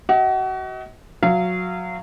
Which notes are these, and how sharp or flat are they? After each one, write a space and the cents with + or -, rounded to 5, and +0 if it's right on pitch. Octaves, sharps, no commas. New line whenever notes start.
F#4 +30 D#5 +45
F#3 -20 F5 -30